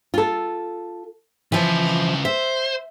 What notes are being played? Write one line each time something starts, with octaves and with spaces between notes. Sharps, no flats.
F4 A4
C#3 E3 F3 B4
C5 E5